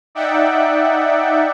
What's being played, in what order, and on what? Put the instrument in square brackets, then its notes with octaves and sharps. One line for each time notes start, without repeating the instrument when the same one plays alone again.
[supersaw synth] D#4 D5 E5 F#5 G5